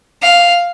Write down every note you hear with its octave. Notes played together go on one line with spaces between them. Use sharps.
F5